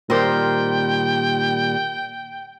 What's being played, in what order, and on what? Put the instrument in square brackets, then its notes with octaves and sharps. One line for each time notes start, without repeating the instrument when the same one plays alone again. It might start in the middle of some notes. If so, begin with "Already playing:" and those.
[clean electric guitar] A#2 D#3 G3 [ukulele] A#4 C5 [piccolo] G5